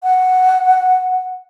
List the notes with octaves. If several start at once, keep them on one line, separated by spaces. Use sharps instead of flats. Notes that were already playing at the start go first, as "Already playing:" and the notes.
F#5